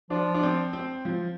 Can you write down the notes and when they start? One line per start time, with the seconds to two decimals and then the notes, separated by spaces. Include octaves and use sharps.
0.10 F3 D4
0.34 D4
0.43 C4
0.73 C4
1.05 F3